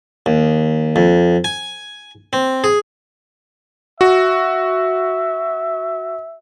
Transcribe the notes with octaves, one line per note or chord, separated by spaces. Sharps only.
D#2
F2
G#5
C4
G#4
F#4 E5